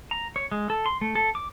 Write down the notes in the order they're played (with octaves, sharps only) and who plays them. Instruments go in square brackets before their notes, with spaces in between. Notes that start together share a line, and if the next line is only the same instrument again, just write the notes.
[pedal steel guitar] A#5
C#5
G#3
A4
C6
A3
A4
D6